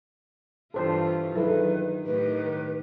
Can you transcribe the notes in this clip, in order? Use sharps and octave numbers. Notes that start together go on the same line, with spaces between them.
G2 E3 F4 A4 C5
D#3 F#3 E4 G#4 A4 B4
A2 D#3 G4 B4